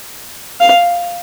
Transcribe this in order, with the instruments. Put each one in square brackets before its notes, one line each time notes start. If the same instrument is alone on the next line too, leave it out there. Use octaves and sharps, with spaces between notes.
[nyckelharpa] F5